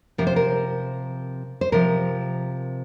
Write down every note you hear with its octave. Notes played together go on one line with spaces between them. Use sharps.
C3 F3 A#4
C5
A#4
C5
C3 F3 A#4